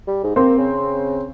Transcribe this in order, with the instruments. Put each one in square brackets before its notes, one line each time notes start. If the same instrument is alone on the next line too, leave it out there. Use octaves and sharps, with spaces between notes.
[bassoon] G3
G#2
[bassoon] A#3 [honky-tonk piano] C4
[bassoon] C#3